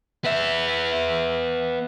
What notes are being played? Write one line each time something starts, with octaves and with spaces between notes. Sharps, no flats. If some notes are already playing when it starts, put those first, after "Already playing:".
B3 E5